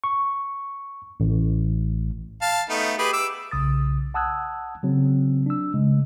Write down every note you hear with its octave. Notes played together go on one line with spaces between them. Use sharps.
C#6
A1
F5 A5
A3 B3 D#4
G4 G#4 B4
D6 E6
B1 C#3 D#6 A6
F#5 A5 D#6 E6 F#6 G#6
C#3 F#3 C4
D4 E6
C#3 G#3